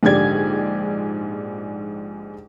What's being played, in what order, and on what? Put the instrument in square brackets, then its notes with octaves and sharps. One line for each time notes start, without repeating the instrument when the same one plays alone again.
[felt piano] A#1 G#2 D3 G4 D5 G#6